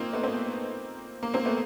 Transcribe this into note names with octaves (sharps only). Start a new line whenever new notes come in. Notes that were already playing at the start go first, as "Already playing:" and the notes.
Already playing: A#3 C4 D#4 F4
A3 B3
A#3 C4
A#3
A#3 C4
A3 B3